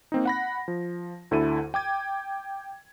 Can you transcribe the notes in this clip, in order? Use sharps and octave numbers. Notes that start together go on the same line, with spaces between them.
A#3 C4 D#4
F#5 B5 A#6
F3
D2 D3 E4 A4 D#7
G5 D6 G#6